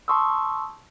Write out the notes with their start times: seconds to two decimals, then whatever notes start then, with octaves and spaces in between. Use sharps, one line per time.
0.08 A5 C6 C#6 D#6 E6